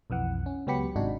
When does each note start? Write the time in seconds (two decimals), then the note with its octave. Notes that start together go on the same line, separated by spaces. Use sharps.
0.10 B1 F2 E3 F#5
0.46 C#4
0.67 C#2 F#3 B3 G4 B5 C#7
0.96 G#1 G#2 C3 D4 D#4 F#4